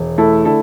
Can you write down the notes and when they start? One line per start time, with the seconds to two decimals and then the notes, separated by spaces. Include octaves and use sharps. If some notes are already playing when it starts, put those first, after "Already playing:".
Already playing: E1
0.18 A3 E4 A4
0.45 D3 E4 A4